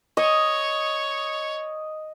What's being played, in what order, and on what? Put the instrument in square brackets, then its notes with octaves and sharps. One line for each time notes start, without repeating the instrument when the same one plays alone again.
[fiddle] C#5 [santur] D#5